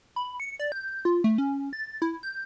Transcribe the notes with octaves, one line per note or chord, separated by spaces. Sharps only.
B5
C#7
D5
G6
F4
A3
C#4
A6
E4
G6